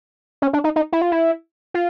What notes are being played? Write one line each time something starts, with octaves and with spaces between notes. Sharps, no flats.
C#4
D4
D#4
D#4
E4
F4
E4
F4